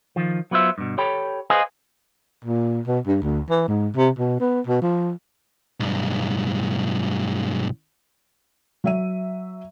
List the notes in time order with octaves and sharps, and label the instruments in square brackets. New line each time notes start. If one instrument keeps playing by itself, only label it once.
[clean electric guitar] D#3 F3
F#3 B3 F4 C5 E5
G2 B2
G4 A4 C#5 G5 B5
G#4 B4 C5 D#5 F5 G#5
[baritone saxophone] A#2
B2
G2
D2
E3
G#2
C3
B2
B3
B2
F3
[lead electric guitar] B1 G2
[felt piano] F#3 E5 D#7